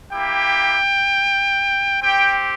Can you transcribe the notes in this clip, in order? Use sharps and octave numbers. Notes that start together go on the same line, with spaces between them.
A#3 E4 G4 G5
C4 G4 G5